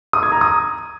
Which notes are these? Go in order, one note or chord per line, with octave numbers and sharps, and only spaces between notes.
D#6
G#6
A#5
D#6